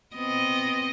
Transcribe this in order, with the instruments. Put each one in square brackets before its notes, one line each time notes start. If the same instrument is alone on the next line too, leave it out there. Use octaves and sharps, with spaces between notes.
[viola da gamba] B3 C4 D#5